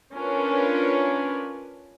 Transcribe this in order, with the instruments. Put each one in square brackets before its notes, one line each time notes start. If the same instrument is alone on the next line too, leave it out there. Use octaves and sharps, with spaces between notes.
[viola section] C#4 D4 F4 A#4 B4